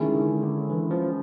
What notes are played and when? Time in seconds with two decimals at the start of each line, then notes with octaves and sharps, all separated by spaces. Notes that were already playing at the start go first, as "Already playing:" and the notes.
Already playing: D#3 G#3 C#4 E4 G#4
0.15 D3
0.43 D3
0.70 E3
0.91 F3